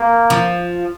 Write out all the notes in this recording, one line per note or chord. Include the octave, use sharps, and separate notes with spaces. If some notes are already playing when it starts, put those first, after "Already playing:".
Already playing: A#3
F3